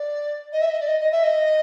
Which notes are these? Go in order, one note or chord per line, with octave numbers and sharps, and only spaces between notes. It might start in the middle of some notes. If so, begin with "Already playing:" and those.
Already playing: D5
D#5
E5
D#5
D5
D#5
D#5
E5
D#5